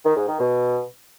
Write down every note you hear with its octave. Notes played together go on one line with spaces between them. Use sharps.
D#3
G#2
D#3
B2